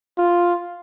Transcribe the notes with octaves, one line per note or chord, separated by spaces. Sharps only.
F4